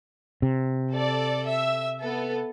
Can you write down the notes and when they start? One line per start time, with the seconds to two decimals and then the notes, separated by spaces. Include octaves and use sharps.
0.42 C3
0.91 A4 D5
1.47 E5
1.99 B3 A4